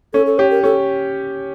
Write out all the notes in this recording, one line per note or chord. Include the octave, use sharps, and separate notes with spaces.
C#4 A4
A4
G4 C#5
A#4
C#4 A4